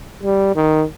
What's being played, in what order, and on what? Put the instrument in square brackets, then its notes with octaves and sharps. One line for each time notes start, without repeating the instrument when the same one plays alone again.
[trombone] G3
D#3